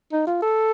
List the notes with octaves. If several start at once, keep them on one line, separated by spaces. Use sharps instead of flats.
D#4
F4
A4